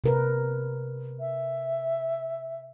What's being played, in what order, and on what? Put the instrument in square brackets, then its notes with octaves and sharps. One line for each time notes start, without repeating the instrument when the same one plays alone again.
[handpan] C3 A#4 B4
[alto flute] E5